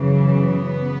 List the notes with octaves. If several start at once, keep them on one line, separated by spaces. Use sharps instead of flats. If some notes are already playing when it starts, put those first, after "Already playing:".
Already playing: F#2 C#3 E3
B3